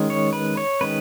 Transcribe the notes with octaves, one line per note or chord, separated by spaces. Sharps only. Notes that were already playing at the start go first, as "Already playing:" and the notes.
Already playing: D#3 G#3 C#4
C#5
B4
C#5
D#3 G#3 C#4 B4